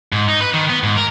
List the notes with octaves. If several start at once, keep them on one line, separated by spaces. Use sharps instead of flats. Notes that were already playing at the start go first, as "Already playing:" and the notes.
G#2
D#4
B4
D#3
B3
G#2
A#4